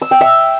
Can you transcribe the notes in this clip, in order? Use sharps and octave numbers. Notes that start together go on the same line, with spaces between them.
E6
G5
E5